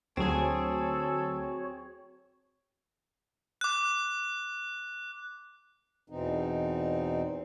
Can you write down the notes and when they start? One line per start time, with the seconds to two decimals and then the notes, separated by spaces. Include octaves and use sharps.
0.17 D2 F#3 C4 F#4 G#4 A4 C#5 G#5
3.61 D6 F#6
6.10 E2 B2 E3 C4 D#4